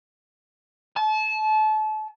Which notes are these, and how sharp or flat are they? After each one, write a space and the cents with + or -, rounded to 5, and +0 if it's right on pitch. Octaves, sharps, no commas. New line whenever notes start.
A5 -30